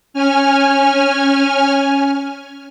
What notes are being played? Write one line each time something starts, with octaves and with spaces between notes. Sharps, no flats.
C#4 G#5 F6